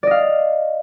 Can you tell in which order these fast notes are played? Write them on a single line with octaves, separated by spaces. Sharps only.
D5 D#5 F5